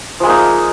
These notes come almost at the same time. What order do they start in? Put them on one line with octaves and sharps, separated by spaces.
F3 G#3 A#3 D#4